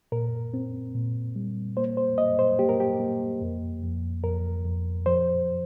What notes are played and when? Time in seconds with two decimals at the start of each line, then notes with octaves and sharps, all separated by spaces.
0.12 A#2 A#4
0.54 C4
0.95 A#2
1.36 G3
1.77 A#3 C5
1.97 C5
2.18 A#3 D#5
2.39 C5
2.59 A#3 G4
2.69 A#4
2.80 G4
3.00 A#3
3.41 F2
3.83 F2
4.24 F2 A#4
4.65 F2
5.06 F3 C5